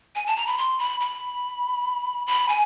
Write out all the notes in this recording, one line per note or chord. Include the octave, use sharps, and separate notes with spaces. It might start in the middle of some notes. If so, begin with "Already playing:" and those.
G#5
A5
A#5
B5
C6
B5
B5
B5
G#5